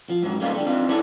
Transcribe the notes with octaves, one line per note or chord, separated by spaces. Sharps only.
F3
G#2 F#3
G3 G#3 A#3 C#4 D#4 F4
D3 G3 A3
C4 D4 D#4 F4
E4 G#4 A4 C#5 D5